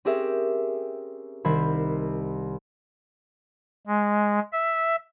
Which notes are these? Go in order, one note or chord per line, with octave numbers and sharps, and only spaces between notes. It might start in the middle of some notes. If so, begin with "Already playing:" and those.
C4 C#4 G4 G#4 A#4 E5
C2 D#3 C5 B5 G#6
G#3
E5